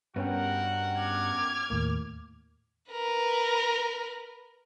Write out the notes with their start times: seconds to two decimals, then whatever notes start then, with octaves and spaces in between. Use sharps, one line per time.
0.16 G2 B3 C#4 F#4 A#4 F#5 G5
0.99 D6 F6 G#6
1.70 D#2 A2 A#3
2.92 A#4 B4